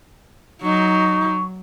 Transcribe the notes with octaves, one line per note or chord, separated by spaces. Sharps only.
F#3 D#4 C#6